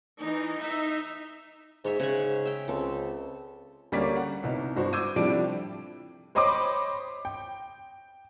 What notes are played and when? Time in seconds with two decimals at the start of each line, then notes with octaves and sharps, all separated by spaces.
0.19 E3 D#4
0.62 D#4 E5
1.85 G#2 G#3 C#5 E5
2.00 G#2 C#3 F#5 C#6
2.46 E5 G5
2.68 C#2 C4 A4
3.92 D2 G3 A#3 C#4 D5 B6
4.16 F#5
4.43 C2 B2 D#4
4.76 G2 F#4 C5
4.93 D6 E6 G6 G#6 D#7
5.16 A2 C3 F3 G3 D4 D7
6.35 C5 C#5 D#5 B5 C6 D6
7.25 G5